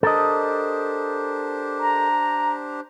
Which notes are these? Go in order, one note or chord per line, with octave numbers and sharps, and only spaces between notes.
D4 G4 A4 A#4 C5 D#5
A#5